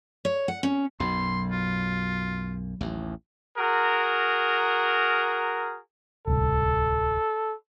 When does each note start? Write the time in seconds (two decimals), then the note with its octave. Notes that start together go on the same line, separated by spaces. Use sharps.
0.25 C#5
0.48 F#5
0.63 C#4
1.00 B1 F#2 F#3 B5 C6
1.52 F4
2.81 A1 D#2
3.58 F#4 G#4 A#4
6.27 D1 C2 A4